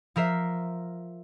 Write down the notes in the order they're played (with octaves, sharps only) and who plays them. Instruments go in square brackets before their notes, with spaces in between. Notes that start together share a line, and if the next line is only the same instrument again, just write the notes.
[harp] F3 A#4 E5 C7